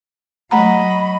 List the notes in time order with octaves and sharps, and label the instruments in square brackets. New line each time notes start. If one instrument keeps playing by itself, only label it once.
[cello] F#3 D#5 [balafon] A3 F#5 A#5 [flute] B5